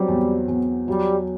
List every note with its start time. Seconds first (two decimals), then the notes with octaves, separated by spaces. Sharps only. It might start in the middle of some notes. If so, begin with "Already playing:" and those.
Already playing: F#3 G3 C4
0.08 E2
0.48 E2
0.87 F#3 G3